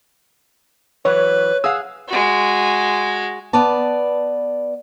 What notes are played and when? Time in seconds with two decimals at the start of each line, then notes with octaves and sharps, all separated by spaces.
1.05 E3 F#3 B4 C#5
1.64 G#4 F5 F#5 E6
2.08 G#3 F#4
3.53 B3 B4 D5 A5